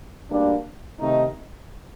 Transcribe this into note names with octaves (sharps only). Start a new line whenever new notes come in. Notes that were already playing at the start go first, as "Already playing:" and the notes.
D2 D3 G3 A#3 D4
C3 D#3 A3 D#4